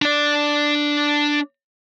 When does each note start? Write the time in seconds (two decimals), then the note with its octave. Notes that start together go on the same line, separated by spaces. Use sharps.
0.02 D4 D5